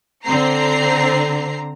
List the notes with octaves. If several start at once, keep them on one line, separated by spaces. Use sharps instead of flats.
D3 C4 A#5 C7